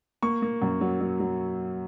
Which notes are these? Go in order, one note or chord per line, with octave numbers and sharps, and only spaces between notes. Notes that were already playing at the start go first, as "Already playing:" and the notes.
A#3 C#6
A#3
F#2
F#3
F#3
F#3